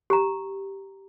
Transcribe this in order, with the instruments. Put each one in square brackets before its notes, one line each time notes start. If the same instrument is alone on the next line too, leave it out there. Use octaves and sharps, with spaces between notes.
[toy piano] G4 A#5